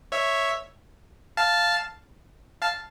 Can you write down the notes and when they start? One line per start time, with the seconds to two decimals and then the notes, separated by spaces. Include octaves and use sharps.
0.12 C#5 E5
1.37 F5 A5
2.62 F5 A5